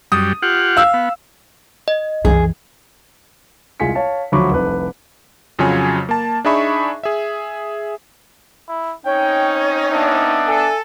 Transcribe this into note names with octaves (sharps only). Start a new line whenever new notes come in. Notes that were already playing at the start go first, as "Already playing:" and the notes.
F#2 G3 D#6
F4 G4 F#5
F5 E6
B3
D#5
C2 F#2 E3 G#4
C2 G#3 F4 G#5 B6 C#7
C#5 F5 A5
D2 F3 F#3 B5 C#6 D6
F1 C2 B4
F2 C#3 F#3 F4 C#5 G#5
A#3 A5
D4 D#4 G#4 E5 B5 C#6
G#4 E5
E4
C4 C#4 D#4 C#5 G5
B3 D4 E5
A4 G#5